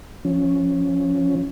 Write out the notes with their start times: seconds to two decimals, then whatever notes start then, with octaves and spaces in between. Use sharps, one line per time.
0.25 F3 C#4